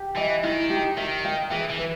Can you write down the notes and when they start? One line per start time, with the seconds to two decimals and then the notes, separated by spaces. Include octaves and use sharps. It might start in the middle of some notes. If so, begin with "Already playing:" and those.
Already playing: G4
0.16 E3 D#5
0.43 D#3 E4
0.70 G4
0.97 D#3 E5
1.25 G5
1.51 E3 G#4
1.70 E3
1.78 B4